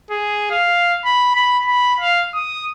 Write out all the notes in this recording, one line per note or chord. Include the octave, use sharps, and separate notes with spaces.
G#4
F5
B5
B5
B5
F5
D#6